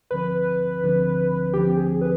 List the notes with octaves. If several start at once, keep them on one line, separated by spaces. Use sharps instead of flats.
D2 D3 F3 C4 B4
D2 D3 F3 C4
D2 D3 F3 C4 G4
G#4
B4